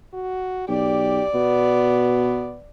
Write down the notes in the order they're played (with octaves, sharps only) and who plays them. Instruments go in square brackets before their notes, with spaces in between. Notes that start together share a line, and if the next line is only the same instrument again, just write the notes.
[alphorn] F#4
[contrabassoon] B1 [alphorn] G4 [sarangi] D5
[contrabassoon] B2 [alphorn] B3